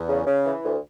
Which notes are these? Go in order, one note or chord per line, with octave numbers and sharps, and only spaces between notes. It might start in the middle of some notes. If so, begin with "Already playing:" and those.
Already playing: E2
C#3
C#3
E3
D2